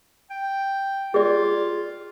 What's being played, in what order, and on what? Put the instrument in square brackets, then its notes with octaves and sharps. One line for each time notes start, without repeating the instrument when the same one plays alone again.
[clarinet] G5
[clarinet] F4 [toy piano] G#4 D5